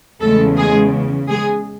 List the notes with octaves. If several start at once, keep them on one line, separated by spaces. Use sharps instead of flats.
E2 C#3 G#3 A3 A4
G#3 G#4
G#3 G#4